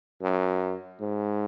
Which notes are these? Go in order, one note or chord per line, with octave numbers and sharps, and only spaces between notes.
F#2
G#2